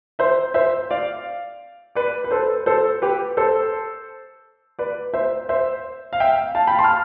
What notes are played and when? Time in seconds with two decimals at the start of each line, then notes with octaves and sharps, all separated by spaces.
0.19 C5 E5
0.54 C5 E5
0.90 D5 F5
1.95 B4 D5
2.24 B4
2.31 A4 C5
2.66 A4 C5
3.02 G4 B4
3.37 A4 C5
4.79 B4 D5
5.14 C5 E5
5.49 C5 E5
6.13 F5
6.20 E5 G5
6.55 F5 A5
6.67 G5 B5
6.79 A5 C6
6.84 F6